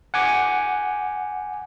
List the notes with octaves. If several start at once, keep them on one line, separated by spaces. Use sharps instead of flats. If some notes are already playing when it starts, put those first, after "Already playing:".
F#5 G#5 D6